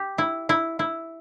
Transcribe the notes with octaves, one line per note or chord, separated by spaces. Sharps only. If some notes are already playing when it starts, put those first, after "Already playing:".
Already playing: G4
E4
E4
E4